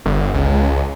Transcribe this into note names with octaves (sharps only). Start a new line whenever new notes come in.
G1
C#2